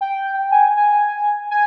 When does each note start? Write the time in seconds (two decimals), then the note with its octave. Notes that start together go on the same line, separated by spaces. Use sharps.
0.01 G5
0.51 G#5
0.76 G#5
1.50 G#5